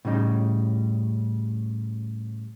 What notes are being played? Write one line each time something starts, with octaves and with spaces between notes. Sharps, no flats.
A2 C#3 G3 D#4